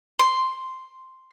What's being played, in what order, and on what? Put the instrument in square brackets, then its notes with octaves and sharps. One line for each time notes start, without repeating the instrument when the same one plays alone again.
[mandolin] C6